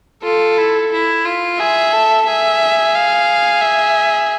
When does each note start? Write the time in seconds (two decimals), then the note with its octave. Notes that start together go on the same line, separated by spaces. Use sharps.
0.23 F4 A4
0.58 E4
0.92 E4
1.25 F4
1.59 G#4 E5
1.93 A4
2.26 G#4 E5
2.95 F5
3.62 E5